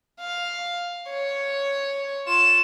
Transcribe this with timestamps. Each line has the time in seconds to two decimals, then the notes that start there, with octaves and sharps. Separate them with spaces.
0.21 F5
1.10 C#5
2.27 F4 E7